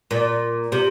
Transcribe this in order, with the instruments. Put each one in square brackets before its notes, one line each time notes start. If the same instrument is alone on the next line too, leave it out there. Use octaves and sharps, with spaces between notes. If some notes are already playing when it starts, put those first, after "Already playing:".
[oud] A#2
C3